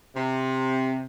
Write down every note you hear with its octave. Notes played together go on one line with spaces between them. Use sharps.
C3